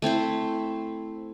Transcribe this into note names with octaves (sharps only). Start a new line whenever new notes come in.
A3 C4 E4 C5